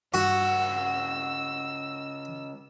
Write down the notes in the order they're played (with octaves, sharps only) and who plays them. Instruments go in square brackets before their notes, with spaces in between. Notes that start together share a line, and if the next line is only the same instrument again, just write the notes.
[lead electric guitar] C#2 F#5 [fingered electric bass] G2 [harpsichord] F#4 [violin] E6